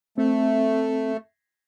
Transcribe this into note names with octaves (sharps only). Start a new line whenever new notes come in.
A3 C4